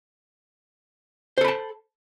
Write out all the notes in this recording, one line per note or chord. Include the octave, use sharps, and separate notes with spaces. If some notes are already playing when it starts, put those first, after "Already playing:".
A4 C5 A5 B5